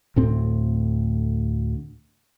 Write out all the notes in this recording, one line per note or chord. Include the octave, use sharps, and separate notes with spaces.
D2 A2 C4